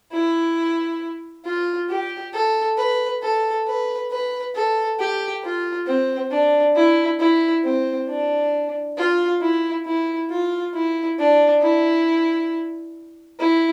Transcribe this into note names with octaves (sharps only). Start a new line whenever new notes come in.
E4
F4
G4
A4
B4
A4
B4
B4
A4
G4
F4
C4
D4
E4
E4
C4
D4
F4
E4
E4
F4
E4
D4
E4
E4